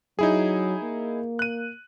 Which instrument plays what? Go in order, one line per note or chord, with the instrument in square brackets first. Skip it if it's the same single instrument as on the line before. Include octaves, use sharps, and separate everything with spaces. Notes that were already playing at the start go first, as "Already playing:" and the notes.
[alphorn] F#3 [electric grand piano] D#4 E4 G#4
[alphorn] A#3
[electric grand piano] F#6 D#7